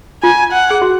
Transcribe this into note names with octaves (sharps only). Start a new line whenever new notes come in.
F4 G#5
F#5
G#4
F#4